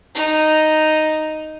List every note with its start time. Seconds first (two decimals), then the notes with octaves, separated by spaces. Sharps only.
0.15 D#4